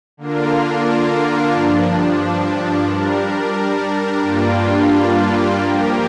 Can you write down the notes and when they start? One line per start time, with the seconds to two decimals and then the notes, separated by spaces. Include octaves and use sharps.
0.17 D3 A#3 D4 F4 A#4
1.53 G2 F3 D4
2.87 G3 D4 A#4
4.22 G2 G3 A#3 D4 F4
5.58 F3 A#3 G4 A#4